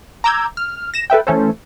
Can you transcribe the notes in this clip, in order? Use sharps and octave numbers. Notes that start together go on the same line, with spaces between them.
A#5 D6 E6 G6 G#6
F6
A#6 E7
A4 B4 E5 G5
E3 A3 C#4 A4 C5